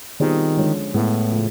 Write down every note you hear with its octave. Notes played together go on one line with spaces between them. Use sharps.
B2 D#3 G3 C4 F4 G#4
D3 F3 G#3 C#4 F4
A2 G#3 B3 E4
C#3 F3 A3